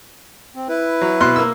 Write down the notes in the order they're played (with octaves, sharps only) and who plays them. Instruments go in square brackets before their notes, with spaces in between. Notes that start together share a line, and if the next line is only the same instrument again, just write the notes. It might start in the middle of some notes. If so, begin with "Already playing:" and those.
[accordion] C4
E4 B4
[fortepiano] F#3
B2 C6 F#6
A#3 E6